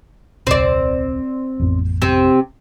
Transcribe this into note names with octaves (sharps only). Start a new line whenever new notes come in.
D#1 C2 C4 D5
A1 F2 B3
C3 C4